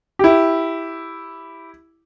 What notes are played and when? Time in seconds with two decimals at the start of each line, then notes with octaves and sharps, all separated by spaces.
0.19 E4 G4